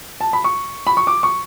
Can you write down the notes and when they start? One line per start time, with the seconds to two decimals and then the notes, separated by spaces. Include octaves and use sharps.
0.21 A5
0.33 B5
0.44 C#6
0.87 B5
0.97 C#6
1.07 D6
1.23 C#6